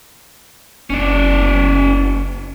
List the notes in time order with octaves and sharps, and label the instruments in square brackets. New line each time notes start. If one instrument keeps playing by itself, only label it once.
[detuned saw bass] F#1 [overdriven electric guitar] C#4 D5